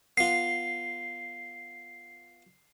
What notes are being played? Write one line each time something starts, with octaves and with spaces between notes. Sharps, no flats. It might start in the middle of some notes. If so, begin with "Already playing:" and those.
B3 F4 C7